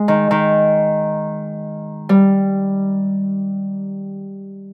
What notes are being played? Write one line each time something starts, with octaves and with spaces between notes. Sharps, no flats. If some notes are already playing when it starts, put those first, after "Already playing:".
Already playing: G#3
D#3
D#3
G3